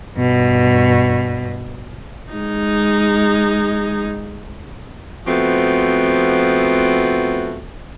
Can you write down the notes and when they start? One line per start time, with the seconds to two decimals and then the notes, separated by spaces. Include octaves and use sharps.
0.15 G2 B2
2.33 G#3 D#4
5.27 F3 A3 B3 C4 F#4